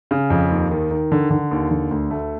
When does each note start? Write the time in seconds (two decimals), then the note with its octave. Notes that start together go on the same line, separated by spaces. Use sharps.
0.11 C#3
0.30 F2
0.51 D#2
0.71 D#3
0.91 D#3
1.12 D3
1.30 D3
1.51 D#2
1.71 D3
1.91 D2
2.11 A3